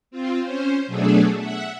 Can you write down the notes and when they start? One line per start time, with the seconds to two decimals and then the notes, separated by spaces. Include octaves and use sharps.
0.11 C4 F4
0.43 C#4 C5
0.87 B2 F#3 A3 D4 G#4 A4
1.37 E5 F#5